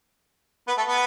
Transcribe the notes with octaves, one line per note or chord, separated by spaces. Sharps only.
B3 B4
A3 A4
B3 B4